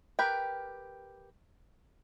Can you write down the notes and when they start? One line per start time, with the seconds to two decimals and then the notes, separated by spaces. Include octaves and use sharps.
0.19 G4 A#4 B4 G5